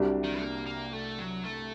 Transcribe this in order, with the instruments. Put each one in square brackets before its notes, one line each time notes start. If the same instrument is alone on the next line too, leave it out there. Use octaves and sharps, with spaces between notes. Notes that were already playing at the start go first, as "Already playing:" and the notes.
Already playing: [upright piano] C2 C3 G3 D4 F#4
[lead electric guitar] D#3
A#3
A#3
A3
F#3
A3